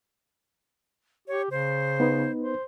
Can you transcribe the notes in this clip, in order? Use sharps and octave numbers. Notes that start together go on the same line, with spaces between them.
G4 C#5
C#3 C5
B3 D#4 B4
C5